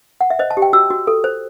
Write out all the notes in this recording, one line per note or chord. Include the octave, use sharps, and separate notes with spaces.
F#5
E5
C5 D#5
A5
G4
G5
F#4 E6
F#4
A4
C5